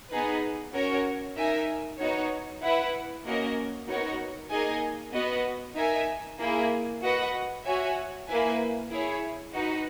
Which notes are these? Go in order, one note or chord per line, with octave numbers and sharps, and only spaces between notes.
B3 D#4 G#4 B4
C#4 F#4 A#4 C#5
D#4 A#4 E5 G#5
B3 D#4 F#4 C#5
E4 B4 F#5
A#3 C#4 F#4 A#4 D#5
B3 D#4 F#4 A#4 C#5
A#3 D#4 G#4 D#5 G#5
B3 F#4 B4 D#5
D#4 A#4 E5 G#5
A#3 E4 G#4
F#4 B4 D#5 F#5
F#4 C#5 E5 G#5
A#3 E4 B4 E5 G#5
E4 G#4 C#5
D#4 F#4 B4